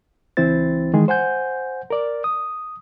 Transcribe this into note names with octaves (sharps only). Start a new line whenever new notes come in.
C#2 E3 C4 E4 C5 A6
D#3 E3 G#3 G#4
C5 F#5 G#5 G6
A#4 D5
D#6